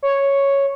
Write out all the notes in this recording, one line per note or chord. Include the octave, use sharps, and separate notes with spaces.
C#5